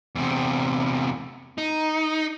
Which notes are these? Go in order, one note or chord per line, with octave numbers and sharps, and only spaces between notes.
E2 C3
D#4